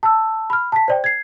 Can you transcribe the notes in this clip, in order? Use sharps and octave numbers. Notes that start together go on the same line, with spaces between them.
A5 E6
B5 F6
A5 B6
C5 D5 G5
G#6 C7